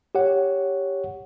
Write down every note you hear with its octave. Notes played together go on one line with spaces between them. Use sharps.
G4 C#5 F#5